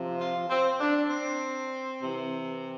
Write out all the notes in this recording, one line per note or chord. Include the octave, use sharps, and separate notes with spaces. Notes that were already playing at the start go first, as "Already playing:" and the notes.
Already playing: C3 F3
F4
C4
D4
C4
C3 E3